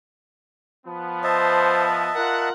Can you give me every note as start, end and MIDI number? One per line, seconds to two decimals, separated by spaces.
0.86 2.10 53
0.86 2.10 59
1.24 1.90 72
1.24 2.49 75
1.24 2.49 76
1.24 2.49 81
2.15 2.52 65
2.15 2.52 70
2.15 2.52 78